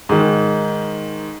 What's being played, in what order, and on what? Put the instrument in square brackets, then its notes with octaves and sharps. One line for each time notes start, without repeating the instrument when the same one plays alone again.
[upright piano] G#2 D#3